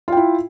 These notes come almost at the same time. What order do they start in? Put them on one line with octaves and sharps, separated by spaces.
F4 G5 E4